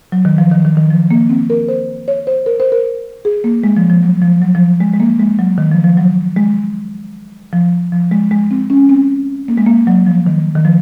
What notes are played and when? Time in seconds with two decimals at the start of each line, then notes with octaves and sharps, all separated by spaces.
0.12 F#3
0.25 D#3
0.38 F3
0.51 D#3
0.65 D#3
0.77 D#3
0.90 F3
1.11 A#3
1.29 C4
1.50 A#4
1.68 C5
2.08 C#5
2.27 C5
2.46 A#4
2.60 C5
2.72 A#4
3.25 G#4
3.44 A#3
3.64 G#3
3.77 F3
3.90 F3
4.03 F#3
4.22 F3
4.41 F#3
4.55 F3
4.80 G#3
4.94 G#3
5.00 A#3
5.20 G#3
5.39 F#3
5.58 D#3
5.71 F3
5.84 F3
5.97 F#3
6.36 G#3
7.53 F3
7.92 F3
8.11 G#3
8.31 G#3
8.51 C4
8.70 C#4
8.89 C4
9.48 A#3
9.58 G#3
9.67 A#3
9.87 F#3
10.07 F3
10.27 D#3
10.55 D#3
10.65 F3